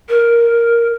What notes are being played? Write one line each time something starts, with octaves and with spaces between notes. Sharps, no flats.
A#4